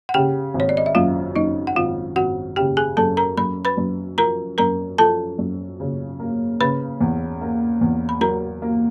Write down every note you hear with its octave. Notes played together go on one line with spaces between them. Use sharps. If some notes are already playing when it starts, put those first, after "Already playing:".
F#5
C#3 G4 G5
G#1
C#5
D5
D#5
E5
F#2 F4 F5
F#2 D#4 D#5
F#5
G#1 F4 F5
G#1 F#4 F#5
C#3 G4 G5
G#4 G#5
F#2 A4 A5
A#4 A#5
F#2 B5
B4 B5
F#2
F3 A#4 A#5
F#2 A#4 A#5
F3 A4 A5
F#2
C#3
A#3
C#3 B4 B5
E2
A#3
E2
B5
F#3 A#4 A#5
A#3